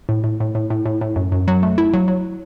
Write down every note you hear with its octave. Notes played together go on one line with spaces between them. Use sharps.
A2
A2
A2
A2
A2
A2
A2
F#2
F#2
F#3
A3
E4
F#3
F#3